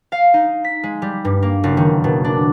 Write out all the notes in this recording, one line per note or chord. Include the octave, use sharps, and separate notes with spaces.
F5
D#4
B6
G#3
G3
G2
A#3
F#1
D#3
B2
D4